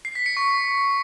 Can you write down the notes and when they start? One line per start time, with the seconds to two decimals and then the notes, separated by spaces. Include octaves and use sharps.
0.05 C7
0.15 B6
0.26 C#7
0.37 C#6